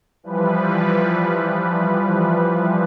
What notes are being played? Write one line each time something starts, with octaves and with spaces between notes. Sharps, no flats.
E3 F3 G3 B4